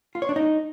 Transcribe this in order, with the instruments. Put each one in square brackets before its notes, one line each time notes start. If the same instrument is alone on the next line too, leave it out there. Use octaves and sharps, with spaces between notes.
[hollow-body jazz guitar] F4
C#5
D4
D#4